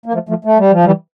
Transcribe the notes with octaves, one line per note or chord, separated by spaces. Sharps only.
A#3
F3 A3
F3 A3
A3
G3
F3
E3 G3